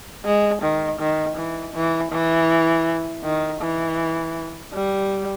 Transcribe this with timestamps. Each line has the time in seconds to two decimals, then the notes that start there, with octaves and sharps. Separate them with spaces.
0.25 G#3
0.62 D#3
1.00 D#3
1.36 E3
1.74 E3
2.12 E3
3.23 D#3
3.61 E3
4.73 G3